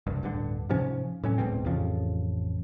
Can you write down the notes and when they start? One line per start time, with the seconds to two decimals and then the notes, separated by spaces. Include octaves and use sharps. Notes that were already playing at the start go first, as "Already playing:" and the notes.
0.06 F#1 C2 G2
0.23 D1 G2 D3
0.69 G#2 C3 F3 C#4
1.24 A2 F#3 C#4
1.38 D1 G#2 B2 C4
1.65 A1 F2 C#3 F3